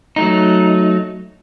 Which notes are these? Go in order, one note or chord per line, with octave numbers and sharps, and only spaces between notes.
F#3 A3 D#4